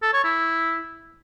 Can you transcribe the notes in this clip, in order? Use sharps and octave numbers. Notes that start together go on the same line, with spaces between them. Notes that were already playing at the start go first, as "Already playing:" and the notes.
A4
C#5
E4